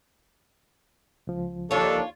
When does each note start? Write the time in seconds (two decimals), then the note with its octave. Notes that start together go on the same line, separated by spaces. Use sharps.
1.27 C#2 F3
1.71 D#2 D4 F4 A4 C#5